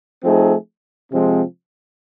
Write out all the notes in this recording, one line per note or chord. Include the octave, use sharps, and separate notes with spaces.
F3 A3 C4 D#4 G#4
C3 F3 G#3 C4